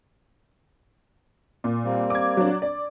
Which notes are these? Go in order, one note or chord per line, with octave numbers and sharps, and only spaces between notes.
A#2
G3 A#3 C4
D6 G#6
F#3 D4
D5